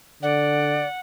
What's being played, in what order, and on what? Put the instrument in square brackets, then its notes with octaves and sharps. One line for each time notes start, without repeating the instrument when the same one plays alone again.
[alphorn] D3 [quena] D5 [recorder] F#5